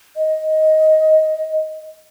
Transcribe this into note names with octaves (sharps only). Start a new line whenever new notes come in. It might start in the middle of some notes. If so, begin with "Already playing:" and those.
D#5